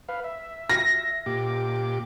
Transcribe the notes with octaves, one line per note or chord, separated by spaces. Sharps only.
B4 F5
E5
A#6
A#2 G4 D6